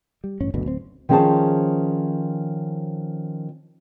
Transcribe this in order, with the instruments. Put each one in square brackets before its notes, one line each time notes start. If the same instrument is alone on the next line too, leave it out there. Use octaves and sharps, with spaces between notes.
[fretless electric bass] G3
A1 G2 C#4
F#1 D2 B2 D3
D1 C4
[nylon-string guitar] D#3 F3 C#4 G#4 C5 A5